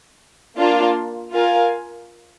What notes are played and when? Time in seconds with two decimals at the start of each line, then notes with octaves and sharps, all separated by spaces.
0.57 A#3 D4 F4
1.32 F4 A#4 F5 G#5